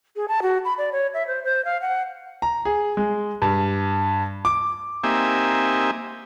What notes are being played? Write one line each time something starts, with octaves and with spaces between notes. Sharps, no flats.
G#4
A5
F#4
B5
D5
C#5
E5
C5
C5
F5
F#5
A#5
G#4
G#3
G2
D6
A#3 C4 D#4 G4 E5 G#5